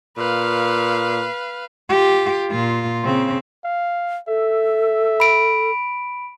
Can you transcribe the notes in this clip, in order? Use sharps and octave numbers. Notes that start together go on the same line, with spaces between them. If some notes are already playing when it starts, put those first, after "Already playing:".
A#2 B4 F5
F4 G4
A#2 F4
C#3 C4
F5
A4 E5
B5 D7